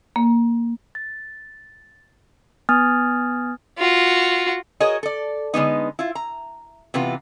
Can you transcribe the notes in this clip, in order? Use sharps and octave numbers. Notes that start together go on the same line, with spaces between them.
A#3
A6
B3 G#5 D#6 F6 G#6 A6
F4 F#4
F#4 G#4 A#4 C#5 D#5
A4 D5
D3 G#3 B3 D#4
E4 F4
A#5
C3 E3 B3 F4